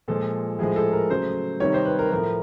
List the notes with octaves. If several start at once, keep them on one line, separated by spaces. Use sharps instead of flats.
A#2 F3 G#3 A4
A2 F3 G#3 G#4
A4
A#4
C#3 F#3 A3 C5
C3 D#3 G3 C#5
C5
B4
A#4
A2 F3 A3 A#4